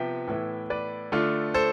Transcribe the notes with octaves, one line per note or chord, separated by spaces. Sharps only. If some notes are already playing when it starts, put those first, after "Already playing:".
Already playing: C3 F3 B3 E5 G5
A2 E3 B3 E4
B4 D5
D3 A3 D4 F4
A4 C5